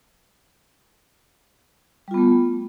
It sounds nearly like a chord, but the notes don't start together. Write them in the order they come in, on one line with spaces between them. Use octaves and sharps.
G3 F4 B3 A3